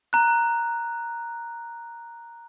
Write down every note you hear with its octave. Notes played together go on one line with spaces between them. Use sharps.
A#5 F#6